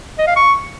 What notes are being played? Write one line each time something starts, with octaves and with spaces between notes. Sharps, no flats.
D#5
F5
C#6